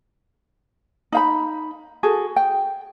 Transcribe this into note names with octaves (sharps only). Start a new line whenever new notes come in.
D#4 F5 B5
F#4 G#4 A4
G5